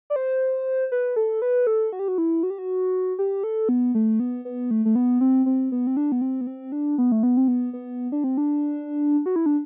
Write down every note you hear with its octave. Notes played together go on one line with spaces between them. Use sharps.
D5
C5
B4
A4
B4
A4
F#4
G4
F#4
E4
F#4
G4
F#4
G4
A4
B3
A3
B3
B3
A3
A3
B3
C4
C4
B3
C4
D4
B3
C4
B3
C4
D4
B3
A3
B3
C4
B3
B3
D4
C4
D4
F#4
E4
D4